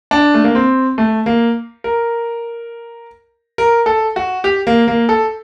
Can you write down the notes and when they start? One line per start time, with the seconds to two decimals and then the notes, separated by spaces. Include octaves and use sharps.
0.11 D4
0.34 A3
0.44 A#3
0.55 C4
0.98 A3
1.26 A#3
1.84 A#4
3.58 A#4
3.86 A4
4.16 F#4
4.44 G4
4.67 A#3
4.88 A#3
5.09 A4